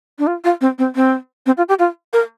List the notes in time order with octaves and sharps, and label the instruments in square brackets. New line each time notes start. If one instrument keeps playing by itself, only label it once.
[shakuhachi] D4
F4
F4
C4
C4
C4
C4
F4
G4
F4
A#4